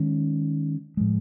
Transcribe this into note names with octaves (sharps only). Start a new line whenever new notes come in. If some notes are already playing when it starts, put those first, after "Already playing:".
Already playing: D#3 G#3 C#4
A2 F3 G#3